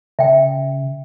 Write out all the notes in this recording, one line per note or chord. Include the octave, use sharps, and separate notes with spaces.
C#3 E5 G5